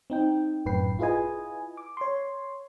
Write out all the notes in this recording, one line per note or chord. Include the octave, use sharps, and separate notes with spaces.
C4 D#4 G5
G1 F#2 A2 B4 G5 C7
E4 F4 G#4 B4 D#5 G#5
D6
C#5 C6